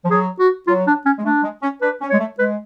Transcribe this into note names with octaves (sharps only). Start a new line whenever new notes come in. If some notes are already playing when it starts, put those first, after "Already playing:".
F3
F#3 G#4
F#4
F#3 F4
D4
C#4
G#3
A3 D4
G#3
C#4
D4 B4
C#4
C#5
G#3
A3
G#3 B4